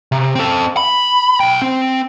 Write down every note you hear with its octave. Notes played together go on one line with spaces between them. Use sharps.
C3
C4 A4
B5
B1 G5
C4